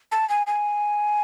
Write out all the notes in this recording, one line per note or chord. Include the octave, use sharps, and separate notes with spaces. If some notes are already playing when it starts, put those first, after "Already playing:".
A5
G#5
G#5